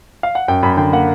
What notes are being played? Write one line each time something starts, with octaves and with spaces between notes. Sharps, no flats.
F5
F#5
F#2 G5
F#2 B5
D3 G5
A#3 F#5